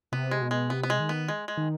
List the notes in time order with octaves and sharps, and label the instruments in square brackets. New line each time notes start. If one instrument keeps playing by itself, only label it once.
[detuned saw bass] C3 [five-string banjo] B3
[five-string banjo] G#3
[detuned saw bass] B2
[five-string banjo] G#3
[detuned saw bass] C3 [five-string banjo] B3
[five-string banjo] B3
G#3
[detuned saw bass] D#3
[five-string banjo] B3
G#3
G#3
[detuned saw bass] D#3